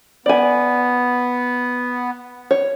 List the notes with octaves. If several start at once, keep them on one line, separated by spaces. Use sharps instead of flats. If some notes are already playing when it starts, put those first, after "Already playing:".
B3 D5 G#5
C#5